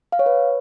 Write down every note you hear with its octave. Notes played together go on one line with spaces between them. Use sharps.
F5
C#5
B4